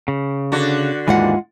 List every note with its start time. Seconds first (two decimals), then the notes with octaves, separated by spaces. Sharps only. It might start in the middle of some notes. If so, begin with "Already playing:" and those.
0.08 C#3
0.52 D3 F#4
1.08 D#2 G#2 E3 G#3 F4 F#5